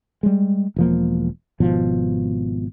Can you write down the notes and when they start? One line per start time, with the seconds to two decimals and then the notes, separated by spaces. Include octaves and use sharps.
0.23 G3 G#3
0.76 E1 F3 A#3
1.60 G#1 B2 F3